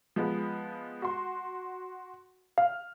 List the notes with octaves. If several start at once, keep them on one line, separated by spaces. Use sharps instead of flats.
F3 G#3 B3
F#4 C6
F5 F6